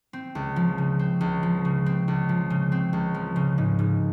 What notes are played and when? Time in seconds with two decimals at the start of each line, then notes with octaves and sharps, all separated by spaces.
0.13 C4
0.35 C#2
0.56 F3
0.78 C#3
0.99 C4
1.21 C#2
1.43 F3
1.65 C#3
1.86 C4
2.08 C#2
2.29 F3
2.50 C#3
2.72 C4
2.93 C#2
3.14 F3
3.36 C#3
3.58 G#2
3.79 G#2